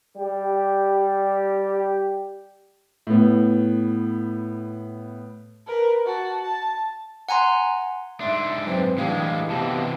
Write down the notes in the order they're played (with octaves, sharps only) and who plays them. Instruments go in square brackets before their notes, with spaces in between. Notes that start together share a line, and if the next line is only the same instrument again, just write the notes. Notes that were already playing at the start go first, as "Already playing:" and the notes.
[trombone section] G3 G4
[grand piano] A2 B3
[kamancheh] A#4 B4
F#4 A5
A5
[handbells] F#5 G#5 A#5 C6
[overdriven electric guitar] G#2 D4 [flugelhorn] E5 [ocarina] C6
[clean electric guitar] F#2 [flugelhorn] C4 [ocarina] B4
[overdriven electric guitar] A2 G#3 [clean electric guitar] E3 D4 [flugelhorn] G4 [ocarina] F5
[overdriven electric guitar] C3 E3 [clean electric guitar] B3 D#5 A5